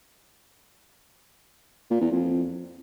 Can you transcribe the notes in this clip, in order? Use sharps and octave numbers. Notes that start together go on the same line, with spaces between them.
A#2
E2
F2